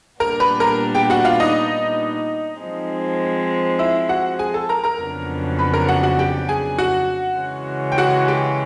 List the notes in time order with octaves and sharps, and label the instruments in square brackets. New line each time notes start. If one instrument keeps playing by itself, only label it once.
[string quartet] A#2 G3 B3 D4 [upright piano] A#4 A#5
[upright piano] B4 B5
A#4 A#5
G4 G5
F#4 F#5
F4 F5
D#4 D#5
[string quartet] F3 G#3 C4
[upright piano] E4 E5
F#4 F#5
G#4 G#5
A4 A5
A#4 A#5
A#4 A#5
[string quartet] F2 C#3 F#3 B3 D4
[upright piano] B4 B5
A#4 A#5
F#4 F#5
F#4 F#5
G4 G5
G#4 G#5
F#4 F#5
[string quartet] C#3 E3 G#3 C#4
[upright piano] G5
F#4 F#5
G4 G5